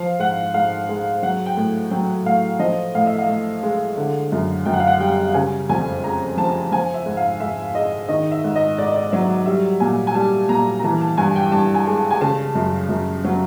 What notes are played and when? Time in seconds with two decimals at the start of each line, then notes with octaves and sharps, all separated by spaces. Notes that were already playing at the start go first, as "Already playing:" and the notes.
Already playing: F3 F5
0.19 G#2 F#5
0.54 G#2 F5
0.89 G#3
1.23 F#3 F#5
1.46 G5
1.57 A2
1.91 F#3 G5
2.25 A2 F5
2.59 F3 D#5
2.95 A2 F5
3.07 E5
3.18 F5
3.28 A2
3.63 G#3
3.97 D3
4.32 F#2
4.65 F#2 G5
4.74 F#5
4.80 F5
4.87 F#5
5.00 G3 G5
5.34 C#3 G#5
5.69 F2 G#5
6.04 G#3 A#5
6.37 F3 A5
6.72 F3 G#5
6.94 E5
7.06 G#2
7.17 F5
7.40 G#2 E5
7.75 G#3 D#5
8.09 D#3 D#5
8.31 E5
8.44 G#2
8.55 D#5
8.78 G#2 D5
8.87 D#5
8.96 D5
9.12 F#3 E5
9.46 G3 E5
9.80 A#2 G#5
10.07 G#5
10.15 G3 A5
10.49 A#2 A#5
10.79 A#5
10.83 E3 A5
11.01 A5
11.17 G2 G#5
11.36 G5
11.52 G2 A5
11.75 G#5
11.87 G#3
11.97 A5
12.11 G#5
12.21 C#3 A5
12.55 F#2
12.89 F#2
13.24 F#3